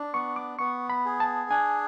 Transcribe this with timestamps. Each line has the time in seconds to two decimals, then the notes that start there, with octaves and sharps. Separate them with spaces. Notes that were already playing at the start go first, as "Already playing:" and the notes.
Already playing: D4
0.14 B3 C#6
0.36 D6
0.59 B3 C#6
0.90 B5
1.05 G#4
1.20 A5
1.50 D4 G#5